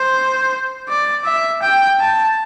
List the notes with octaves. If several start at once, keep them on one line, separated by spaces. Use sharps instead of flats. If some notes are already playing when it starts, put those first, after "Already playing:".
Already playing: C5
D5
E5
G5
A5